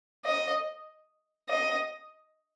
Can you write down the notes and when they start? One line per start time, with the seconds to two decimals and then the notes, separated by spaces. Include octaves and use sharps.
0.25 D#5
1.49 D#5